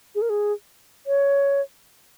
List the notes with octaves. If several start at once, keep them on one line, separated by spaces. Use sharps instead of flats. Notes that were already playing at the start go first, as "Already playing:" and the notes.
G#4
A#4
G#4
C#5